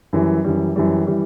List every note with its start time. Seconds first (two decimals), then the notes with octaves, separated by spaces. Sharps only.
0.13 F#2 E3 G3
0.44 F#2 E3 G3
0.76 F#2 E3 G3
1.07 E3 G3